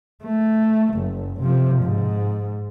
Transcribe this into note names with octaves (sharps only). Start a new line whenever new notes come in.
A3
F#1
C3 F3
G#2